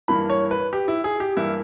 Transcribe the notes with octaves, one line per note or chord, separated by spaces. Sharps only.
G2 E3 A#3 B5
C#5
B4
G4
E4
G#4
G4
G2 E3 A#3 E4